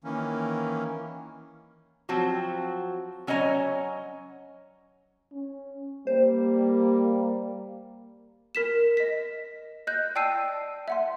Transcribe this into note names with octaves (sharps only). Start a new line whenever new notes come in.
D#3 E3 A#3 C#4
F3 F#3 C4 F#4
F#3 C#4 C#5 D#5 G#5 A#5
C#4
G3 A#3 C5
A#4 B6 E7
D#5 B6
D#5 F#6 G6
D5 G5 A5 E6 C7 D#7
E5 F#5 C6